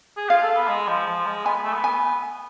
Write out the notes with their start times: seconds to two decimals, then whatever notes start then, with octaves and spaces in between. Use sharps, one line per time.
0.17 G#4
0.29 F4 F5
0.43 A4
0.56 B3
0.68 G#3
0.88 F3
1.07 F3
1.26 G#3
1.46 B3 G#5
1.64 A3
1.74 B3
1.84 G#5